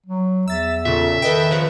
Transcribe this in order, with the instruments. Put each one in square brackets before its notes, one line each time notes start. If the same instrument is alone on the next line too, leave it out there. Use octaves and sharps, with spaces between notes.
[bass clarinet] F#3
[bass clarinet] E2 [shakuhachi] E5 [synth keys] E6 A6
[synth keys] A#2 C#3 [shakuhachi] A4 [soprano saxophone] E5
[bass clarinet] D#3 [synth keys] A4 D#5 G5 [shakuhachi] B4
[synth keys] C#3 F3